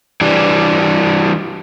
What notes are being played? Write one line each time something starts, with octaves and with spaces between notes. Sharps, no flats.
E3 G3 D4